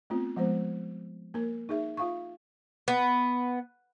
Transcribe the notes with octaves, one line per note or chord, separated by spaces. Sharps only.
A3 B3 C4 F4
F3 G#3 B3 C5
A#3 A#4
D#4 G#4 E5
F4 F5 C#6
B3